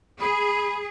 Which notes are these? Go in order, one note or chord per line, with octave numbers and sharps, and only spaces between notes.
G#4 B5